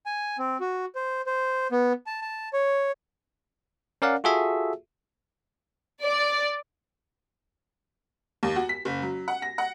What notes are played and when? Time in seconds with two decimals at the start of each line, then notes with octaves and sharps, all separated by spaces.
0.06 G#5
0.38 C4
0.60 F#4
0.95 C5
1.26 C5
1.72 B3
2.06 A5
2.22 A5
2.53 C#5
4.02 C#4 A#4 D5 F5 F#5
4.24 F4 F#4 G#4 A4 E5
6.04 D5
8.43 D#2
8.56 F#4
8.69 B6
8.85 F#1
9.02 F#3
9.28 F#5
9.42 A#6
9.58 F#5